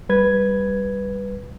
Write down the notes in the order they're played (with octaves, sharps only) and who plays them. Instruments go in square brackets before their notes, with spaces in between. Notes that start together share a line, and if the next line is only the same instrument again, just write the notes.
[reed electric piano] G3 B4 G#6